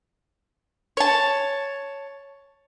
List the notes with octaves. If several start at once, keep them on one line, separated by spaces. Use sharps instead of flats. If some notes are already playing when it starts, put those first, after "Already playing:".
C#5 A5